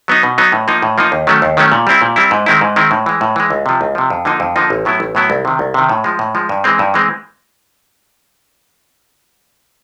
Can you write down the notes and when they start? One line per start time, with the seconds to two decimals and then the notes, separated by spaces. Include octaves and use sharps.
0.08 F#3 B3 D#4
0.23 B2
0.38 F#3 B3 D#4
0.52 A2
0.68 F3 A#3 D#4
0.82 A2
0.98 F3 A#3 D#4
1.12 D#2
1.27 D#3 F#3 A3 C#4
1.42 D#2
1.57 D#3 F#3 A3 C#4
1.72 A#2
1.87 G3 C4 E4
2.02 A#2
2.16 G3 C4 E4
2.31 G#2
2.46 D#3 G#3 C4 E4
2.61 G#2
2.76 D#3 G#3 C4 E4
2.91 A2
3.06 E3 G#3
3.21 A2
3.36 E3 G#3
3.50 C#2
3.66 C3 F3
3.81 C#2
3.95 C3 F3
4.10 F2
4.25 D3 F3 A#3 D#4
4.40 F2
4.56 D3 F3 A#3 D#4
4.70 A1
4.85 A2 F#3 B3 E4
5.00 A1
5.15 A2 F#3 B3 E4
5.30 C2
5.45 C3 D#3
5.59 C2
5.74 C3 D#3
5.89 A2
6.04 F3 G#3
6.19 A2
6.35 F3 G#3
6.49 G2
6.64 E3 G#3 C4
6.79 G2
6.94 E3 G#3 C4